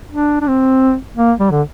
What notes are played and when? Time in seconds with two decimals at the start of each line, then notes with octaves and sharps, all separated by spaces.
0.12 D4
0.41 D4
0.47 C4
1.16 A#3
1.39 G3
1.50 D3